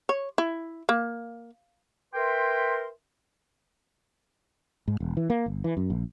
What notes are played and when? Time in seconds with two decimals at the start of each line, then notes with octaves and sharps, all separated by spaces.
0.09 C#5
0.38 E4
0.89 A#3
2.14 A#4 B4 E5 G5 C6
4.88 G#2
5.00 E1
5.17 E3
5.30 A#3
5.46 G1
5.64 E3
5.77 F#2
5.90 A#1